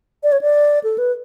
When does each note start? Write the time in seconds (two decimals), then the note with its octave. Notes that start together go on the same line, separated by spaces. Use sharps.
0.23 D5
0.32 C#5
0.41 D5
0.83 A4
0.98 B4